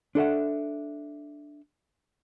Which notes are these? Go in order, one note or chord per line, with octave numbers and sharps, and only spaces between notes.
D4 A4 E5 F#5